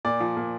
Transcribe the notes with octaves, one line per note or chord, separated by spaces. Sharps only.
A#2 D5
F3
A#2